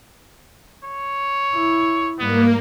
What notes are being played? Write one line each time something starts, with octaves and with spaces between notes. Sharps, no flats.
C#5
E4
G#2 G3 A#3 B3